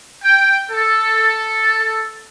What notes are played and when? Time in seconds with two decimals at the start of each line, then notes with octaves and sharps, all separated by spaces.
0.24 G5
0.71 A4